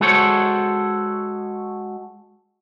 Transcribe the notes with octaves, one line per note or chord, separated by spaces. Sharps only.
G#3 F#4 G#4 A4 C5 C#5